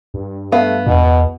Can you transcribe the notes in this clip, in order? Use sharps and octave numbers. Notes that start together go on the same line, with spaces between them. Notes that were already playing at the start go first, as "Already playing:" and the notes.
G2
A3 B3 F5
E2 B2